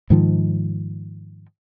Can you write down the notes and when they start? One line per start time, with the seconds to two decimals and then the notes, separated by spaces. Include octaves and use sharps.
0.10 G#2 D#3 F3